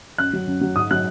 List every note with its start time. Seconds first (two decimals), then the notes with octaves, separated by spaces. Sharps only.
0.18 F#2 F#6
0.33 F#3
0.47 F#2
0.61 F#3
0.75 G#2 D#6
0.91 F#3 F#6